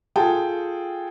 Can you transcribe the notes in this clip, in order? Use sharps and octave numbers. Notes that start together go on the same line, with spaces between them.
F4 G#4 A4 G5 A5